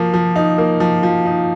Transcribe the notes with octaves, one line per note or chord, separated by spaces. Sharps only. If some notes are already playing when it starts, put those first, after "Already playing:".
Already playing: F3 A#3
F3
D#4
A#3
F3
F3
D#4